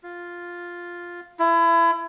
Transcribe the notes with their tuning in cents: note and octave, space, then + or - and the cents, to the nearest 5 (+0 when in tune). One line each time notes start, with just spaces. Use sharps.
F4 +0
E4 +30